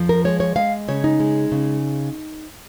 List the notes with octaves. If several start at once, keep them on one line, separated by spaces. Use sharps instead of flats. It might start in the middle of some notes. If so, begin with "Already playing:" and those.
Already playing: F2 F3
A#4
G#3 C#5
C#5
G#3 F5
C#3 C#5
D#4
G#3
C#3